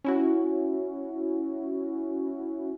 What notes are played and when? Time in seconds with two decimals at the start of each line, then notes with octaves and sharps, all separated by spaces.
0.04 C#4 E4 F#4